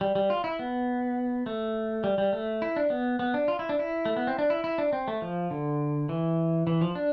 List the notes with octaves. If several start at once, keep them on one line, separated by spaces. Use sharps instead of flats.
G3
G3
F4
E4
B3
A3
G3
G3
A3
E4
D4
B3
B3
D4
F4
E4
D4
E4
A3
B3
C4
D4
E4
E4
D4
C4
A3
F3
D3
E3
E3
F3
D4